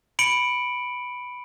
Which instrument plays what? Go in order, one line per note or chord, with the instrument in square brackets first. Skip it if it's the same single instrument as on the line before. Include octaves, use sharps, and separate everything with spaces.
[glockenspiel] B5 C#7 D7 F#7